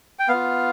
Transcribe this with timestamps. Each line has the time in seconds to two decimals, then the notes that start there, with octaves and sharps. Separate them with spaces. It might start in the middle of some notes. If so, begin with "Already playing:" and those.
0.19 G5
0.29 B3 F4 F5